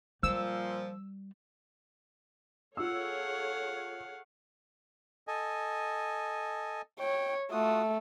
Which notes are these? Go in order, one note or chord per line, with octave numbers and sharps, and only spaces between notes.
A#2 F3 G3 E6
F4 G#4 A4 C#5 F5 F#5 E6
A4 D#5 G#5
C#5 G5
A3 F4 F#4 D#6